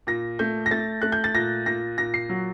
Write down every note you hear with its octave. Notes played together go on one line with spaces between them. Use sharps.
A#2 A#6
A3 G6
A#6
A3 A6
A3 F#6
G6
A6
A#2 A#6
A#2 A#6
A#2 A#6
C7
F#3